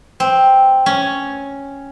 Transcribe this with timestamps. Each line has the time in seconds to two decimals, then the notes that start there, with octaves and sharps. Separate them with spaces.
0.20 C4
0.86 C#4